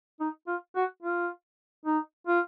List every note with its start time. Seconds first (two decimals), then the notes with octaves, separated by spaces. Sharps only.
0.20 D#4
0.47 F4
0.76 F#4
1.03 F4
1.86 D#4
2.27 F4